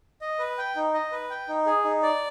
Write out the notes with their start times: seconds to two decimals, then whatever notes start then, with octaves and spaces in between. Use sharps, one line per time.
0.21 D#5
0.39 B4
0.58 G5
0.76 D#4
0.94 D#5
1.12 B4
1.30 G5
1.48 D#4
1.66 G#4
1.84 D#4
2.03 D5